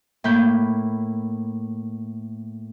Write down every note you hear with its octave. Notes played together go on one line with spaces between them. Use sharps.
A2 A#3 B5 G6